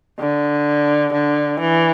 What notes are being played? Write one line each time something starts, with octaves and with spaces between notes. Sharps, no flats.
D3
D3
E3